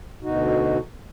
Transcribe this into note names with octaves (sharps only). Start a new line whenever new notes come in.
D2 B2 D#4 F#4